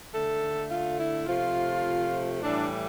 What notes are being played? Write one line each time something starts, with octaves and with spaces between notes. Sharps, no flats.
D3 A3 A4
F4
E4
C3 F3 A3 F4
A2 E3 G3 D4